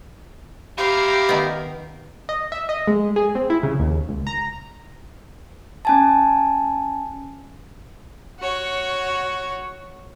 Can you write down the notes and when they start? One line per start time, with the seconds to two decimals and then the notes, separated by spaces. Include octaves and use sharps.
0.78 E4 F4 G4 F5 A#5
1.29 D#3 B3
2.29 D#5
2.52 E5
2.69 D#5
2.87 G#3
3.16 G#4
3.35 C4
3.50 E4
3.63 C#3
3.79 D#2
4.09 C#2
4.27 A#5
5.85 C#4 G#5 A5
8.40 F#4 C#5